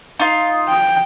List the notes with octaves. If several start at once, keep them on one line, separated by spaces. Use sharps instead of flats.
D#4 F4
G5